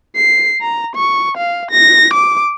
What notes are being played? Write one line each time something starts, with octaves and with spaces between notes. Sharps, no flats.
C7
A#5
C#6
F5
A#6
D6